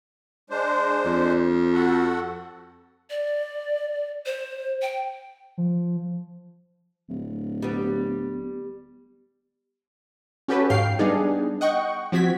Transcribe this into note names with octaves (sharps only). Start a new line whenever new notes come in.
G#3 D4 C5
F2
F#4 A4 F#5
D5
C5
G5
F3
D1
G3 B3
C#4 F#4 G4 A4 B4 C#5
G#2 F5 G5 C7
G3 B3 D4 D#4 G#4
D#5 F#5 G5 C#6
F3 C4 F#4 G#6 B6